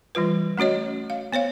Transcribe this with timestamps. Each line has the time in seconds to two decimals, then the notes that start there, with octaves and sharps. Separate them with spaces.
0.15 E3 G3 F4 B4
0.58 A3 C#4 F#4 C#5 D#5
1.10 F5
1.32 B3 C5 C#5 F5